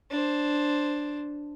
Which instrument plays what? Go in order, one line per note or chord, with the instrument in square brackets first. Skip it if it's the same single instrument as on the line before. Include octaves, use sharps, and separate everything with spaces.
[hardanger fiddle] D4 C5